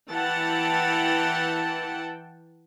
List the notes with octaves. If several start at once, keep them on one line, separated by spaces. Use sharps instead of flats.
E3 F#5 G5 A5